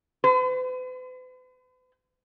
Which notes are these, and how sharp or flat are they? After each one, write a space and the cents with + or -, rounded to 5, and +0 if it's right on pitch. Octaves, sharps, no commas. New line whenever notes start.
B4 +45